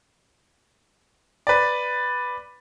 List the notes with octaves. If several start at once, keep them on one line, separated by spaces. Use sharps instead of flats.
B4 D5